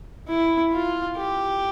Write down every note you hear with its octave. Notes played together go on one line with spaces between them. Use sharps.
E4
F4
G4